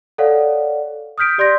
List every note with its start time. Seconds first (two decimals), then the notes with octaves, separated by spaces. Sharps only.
0.18 A4 C#5 D5 F5 F#5
1.18 D#6 F6 G6 B6 D7
1.38 G4 D5 C6 G6 A#6